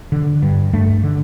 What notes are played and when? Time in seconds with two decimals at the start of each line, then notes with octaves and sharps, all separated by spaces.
0.12 D3
0.42 G2
0.73 G2 A3
1.03 D3